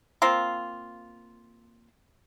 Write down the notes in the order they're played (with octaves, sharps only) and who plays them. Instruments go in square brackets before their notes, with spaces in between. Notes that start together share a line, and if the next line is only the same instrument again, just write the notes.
[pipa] A#3 C4 F4